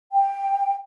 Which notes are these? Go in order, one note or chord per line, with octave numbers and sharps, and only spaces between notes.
G5